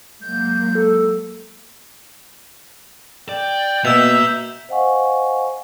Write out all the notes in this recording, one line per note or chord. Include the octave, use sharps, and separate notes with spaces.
F#3 G#3 A#3 G6
A4
D5 G5
B2 A#3 E5 E6 G6 F7
C5 D#5 F5 F#5 G#5 C#6